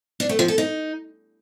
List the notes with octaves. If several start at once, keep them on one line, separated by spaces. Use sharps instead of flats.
D4
A3
F3
A4
D#4